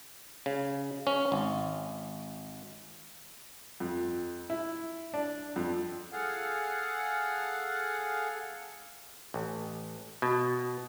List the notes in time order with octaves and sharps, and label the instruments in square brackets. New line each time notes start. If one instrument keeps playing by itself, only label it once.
[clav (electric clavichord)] C#3
C#4
G#1
[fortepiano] F2
E4
D4
F2
[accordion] G#4 A4 F5 F#5
[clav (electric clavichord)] A1
B2